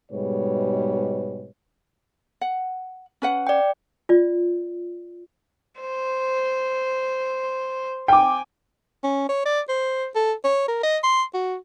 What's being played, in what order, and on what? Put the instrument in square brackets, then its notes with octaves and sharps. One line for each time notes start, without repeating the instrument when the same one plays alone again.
[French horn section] G#2 B2 G3 G#3 B4 C#5
[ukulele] F#5
C#4 B4 F#5
[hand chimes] D5 G5
[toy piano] F4 D5
[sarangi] C5
[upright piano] G5 D6 [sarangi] G#5
[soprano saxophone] C#4
C#5
D5
C5
A4
C#5
A#4
D#5
C6
F#4